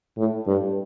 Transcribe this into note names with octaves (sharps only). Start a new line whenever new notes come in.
A2
G2